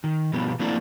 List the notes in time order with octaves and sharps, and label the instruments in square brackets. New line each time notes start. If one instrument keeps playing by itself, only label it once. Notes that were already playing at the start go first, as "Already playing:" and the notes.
[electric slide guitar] D#3
B2 F3 G3 B3
F3 A3 A#3 C4 D4 E4